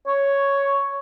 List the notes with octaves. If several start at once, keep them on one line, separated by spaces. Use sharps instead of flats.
C#5